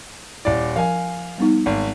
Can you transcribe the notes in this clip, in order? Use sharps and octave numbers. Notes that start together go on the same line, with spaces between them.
D#1 E4 D5
F3 A#4 F5 G#5
G3 B3 D#4
G#1